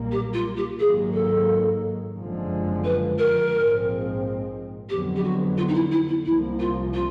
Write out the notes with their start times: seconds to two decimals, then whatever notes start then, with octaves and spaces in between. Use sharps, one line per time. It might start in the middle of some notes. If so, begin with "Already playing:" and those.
Already playing: B1 A#2 G3 A#3
0.12 G4
0.34 F4
0.57 G4
0.80 G#1 G#2 D#3 F#3 A#3 G#4
1.13 A4
2.16 F#1 F2 D3 F3 G#3
2.84 B4
3.19 A#4
3.53 A#1 G#2 F3 G#3 C4
4.89 F2 D3 F#3 B3 G4
5.16 G4
5.24 F#4
5.57 F4
5.68 D#4
5.74 E4
5.91 E4
6.08 E4
6.25 C2 C3 F3 A#3 E4
6.60 F4
6.94 F4